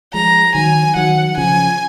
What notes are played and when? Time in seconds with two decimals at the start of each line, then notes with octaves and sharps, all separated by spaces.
0.14 F3 G#3 A#5
0.55 D#3 F#3 G#5
0.96 D#3 F#3 F#5
1.37 C#3 F3 G#5